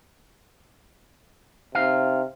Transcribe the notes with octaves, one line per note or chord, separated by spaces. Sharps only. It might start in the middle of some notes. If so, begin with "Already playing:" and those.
C3 D#4 F5